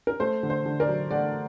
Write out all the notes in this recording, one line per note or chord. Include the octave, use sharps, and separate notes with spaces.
A#4
A3 C5
D3
C5
D3
A#4 D5
F#3
A3 D5 F#5